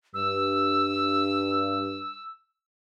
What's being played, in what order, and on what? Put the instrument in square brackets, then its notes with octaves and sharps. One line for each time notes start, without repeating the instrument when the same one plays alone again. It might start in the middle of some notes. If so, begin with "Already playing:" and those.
[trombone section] G2 [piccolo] E6